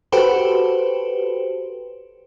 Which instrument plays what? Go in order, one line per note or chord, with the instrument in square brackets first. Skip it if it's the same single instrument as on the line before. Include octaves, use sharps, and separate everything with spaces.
[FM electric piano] F#4 G4 A4 B4 C5